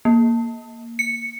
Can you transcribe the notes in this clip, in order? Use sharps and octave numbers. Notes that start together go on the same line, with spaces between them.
A#3
C#7